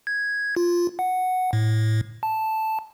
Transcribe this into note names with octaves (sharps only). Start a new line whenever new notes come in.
G#6
F4
F#5
A2
A5